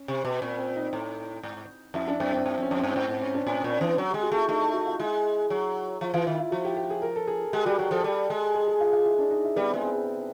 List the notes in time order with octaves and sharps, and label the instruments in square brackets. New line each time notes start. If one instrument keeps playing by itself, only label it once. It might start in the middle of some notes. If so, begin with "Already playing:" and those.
Already playing: [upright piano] C#4
[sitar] C3
B2
[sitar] A#2 [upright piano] C4
[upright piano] C4
D#4
[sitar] A2
G#2
[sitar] F2 [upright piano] E4
[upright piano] D4
[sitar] F#2 [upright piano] C4
[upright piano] C4
[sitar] G2 [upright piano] C4
[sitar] F2
[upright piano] C#4
[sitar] F2
[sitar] G2 [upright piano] C4
[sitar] G#2 [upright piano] C4
[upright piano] C4
C#4
D4
[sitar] A2 [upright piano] D4
[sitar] A#2 [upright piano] C4
[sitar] E3 [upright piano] D4
[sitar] F#3
[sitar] G#3 [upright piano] G4
[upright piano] F#4
[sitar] A3 [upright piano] E4
[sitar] A3 [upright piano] D#4
[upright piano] D#4
F#4
F4
[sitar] G#3 [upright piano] E4
[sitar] F#3
[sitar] F3 [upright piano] F4
[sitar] E3 [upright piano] F4
[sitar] D#3 [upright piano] E4
[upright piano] F4
[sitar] F3 [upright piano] F#4
[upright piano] G4
G4
G#4
A#4
A4
G#4
[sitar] G#3 [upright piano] G4
[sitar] G3 [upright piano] F#4
[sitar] F#3 [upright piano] G4
[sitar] F3 [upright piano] A4
[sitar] G3
G#3
[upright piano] G#4
G#4
F4
F4
E4
D4
D#4
E4
[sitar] G3 [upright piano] B3
[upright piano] C4
[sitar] G#3
[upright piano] C4